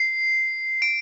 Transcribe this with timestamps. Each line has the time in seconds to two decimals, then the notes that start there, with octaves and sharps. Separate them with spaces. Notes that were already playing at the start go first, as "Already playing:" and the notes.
Already playing: C7
0.82 D7